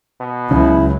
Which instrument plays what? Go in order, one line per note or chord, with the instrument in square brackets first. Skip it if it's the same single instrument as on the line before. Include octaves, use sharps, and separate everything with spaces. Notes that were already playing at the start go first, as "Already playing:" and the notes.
[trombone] B2
[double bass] C#2 F#3 [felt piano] C#3 [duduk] E4